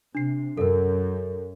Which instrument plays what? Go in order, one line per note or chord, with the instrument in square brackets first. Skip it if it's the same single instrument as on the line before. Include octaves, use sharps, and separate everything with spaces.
[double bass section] C3 [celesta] D4 C7
[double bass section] F#2 [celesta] A4 A#4